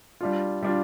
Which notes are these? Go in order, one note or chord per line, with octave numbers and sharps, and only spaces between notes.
G3 D4 F4
G3 D4 F4